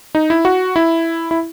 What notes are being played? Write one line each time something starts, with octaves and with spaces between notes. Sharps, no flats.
D#4
E4
F#4
E4
E4